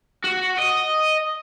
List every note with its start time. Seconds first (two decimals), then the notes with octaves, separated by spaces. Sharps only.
0.24 F#4
0.59 D#5